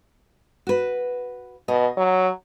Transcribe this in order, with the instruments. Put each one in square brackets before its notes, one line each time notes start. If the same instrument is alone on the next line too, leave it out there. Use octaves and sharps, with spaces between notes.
[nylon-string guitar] F#4 B4
[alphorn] B2 [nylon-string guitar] D#5
[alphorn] F#3